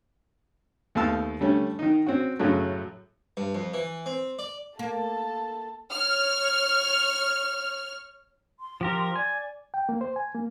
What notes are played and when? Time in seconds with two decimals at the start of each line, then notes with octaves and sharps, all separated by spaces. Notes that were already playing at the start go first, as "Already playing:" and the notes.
0.95 D#2 A3 B3 F5 A5 E6
1.40 D3 G3 A3 C#4
1.79 D#3 D#4
2.07 C4 C#4 F#4
2.39 F#2 A2 C#3 F#3 A3
3.37 G2
3.55 F2
3.74 E3
4.06 C4
4.39 D5
4.79 A#3 A4 A5
5.91 C#5 F6
8.59 C6
8.81 F3 G4 A#4
9.16 D5 G#5
9.74 G5
9.89 A#3
10.01 C5
10.16 G#5
10.35 A#3